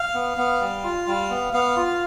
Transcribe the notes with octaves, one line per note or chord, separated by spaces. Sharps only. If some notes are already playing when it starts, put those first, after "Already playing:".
Already playing: F5
B3
B3
G3
F4
G3
B3
B3 F5
F4